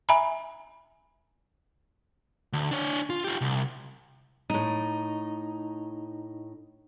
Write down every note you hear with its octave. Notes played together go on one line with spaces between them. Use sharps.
E5 G#5 A#5 B5
D2
D4 C#5
F4
F4 G4
C2
A2 D#4